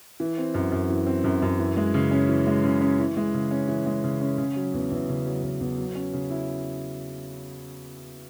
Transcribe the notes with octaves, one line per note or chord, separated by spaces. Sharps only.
E3
C4
F#2
F#2
E3
C4
F#2
F#2
E3
G#3
C#3
C#4
E3
G#3
C#3
C#4
E3
G#3
C#3
C#4
E3
G#3
C#3
C#4
C#3
F#3
E2
E2
C#3
F#3
E2
E2
F#3
C#4
C#3
E4